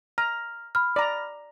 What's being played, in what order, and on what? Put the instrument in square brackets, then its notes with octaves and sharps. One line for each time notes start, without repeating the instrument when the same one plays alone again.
[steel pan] A#5 [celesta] F6
[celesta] B5 F6
[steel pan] D5 A#5